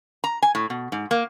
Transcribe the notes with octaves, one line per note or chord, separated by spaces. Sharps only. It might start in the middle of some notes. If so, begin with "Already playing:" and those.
A#5
G#5
A2
B2
G#2
A#3